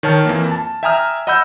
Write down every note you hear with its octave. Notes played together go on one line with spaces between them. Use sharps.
D#3 C#5 A5 F6
F2 E3 A#3
A5
E5 G5 G#5 A#5 D#6 F6
D#5 F#5 B5 E6 G6